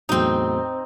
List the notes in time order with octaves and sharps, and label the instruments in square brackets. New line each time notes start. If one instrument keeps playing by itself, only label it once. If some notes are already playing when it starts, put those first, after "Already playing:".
[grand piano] E2 A2 F#3 [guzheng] C4 D#4